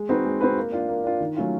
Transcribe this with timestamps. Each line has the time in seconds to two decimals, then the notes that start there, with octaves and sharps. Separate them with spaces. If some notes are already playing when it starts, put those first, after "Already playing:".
Already playing: G#3
0.09 C4 D#4 F#4 B4
0.25 G#3
0.41 C4 D#4 F#4 B4
0.57 A#3
0.72 D4 F4
0.89 A#3
1.04 D4 F4
1.21 D#3
1.37 F#3 A3 C#4 F4